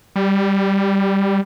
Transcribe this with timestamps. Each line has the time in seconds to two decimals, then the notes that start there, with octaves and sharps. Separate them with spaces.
0.16 G3